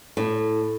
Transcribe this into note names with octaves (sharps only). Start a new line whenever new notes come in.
A2